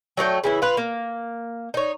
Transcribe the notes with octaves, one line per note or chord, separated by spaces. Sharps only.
F#3 A3 D5 G5
C#3 E3 E4
F4 B4
A#3
D#4 C#5